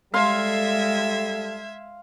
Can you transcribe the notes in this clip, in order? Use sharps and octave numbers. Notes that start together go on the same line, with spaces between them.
G3 G#3 A4 E5 F5 C6 G#6